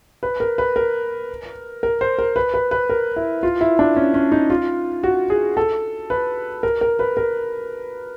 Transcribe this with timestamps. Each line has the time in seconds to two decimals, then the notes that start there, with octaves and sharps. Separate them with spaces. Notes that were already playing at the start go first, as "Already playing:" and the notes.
0.23 B4
0.40 A#4
0.58 B4
0.76 A#4
1.83 A#4
2.01 C5
2.19 A#4
2.36 B4
2.54 B4
2.71 B4
2.90 A#4
3.16 E4
3.43 F4
3.61 E4
3.79 D4
3.97 C#4
4.14 C#4
4.32 D#4
4.50 F4
5.03 F#4
5.30 G#4
5.57 A4
6.10 B4
6.63 A#4
6.81 A#4
6.99 B4
7.17 A#4